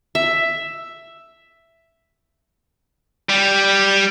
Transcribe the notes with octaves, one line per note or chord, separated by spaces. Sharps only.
E5
G3